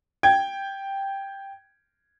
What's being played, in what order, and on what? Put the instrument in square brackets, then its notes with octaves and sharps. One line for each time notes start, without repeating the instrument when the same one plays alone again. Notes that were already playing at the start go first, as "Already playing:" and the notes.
[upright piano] G5 G#6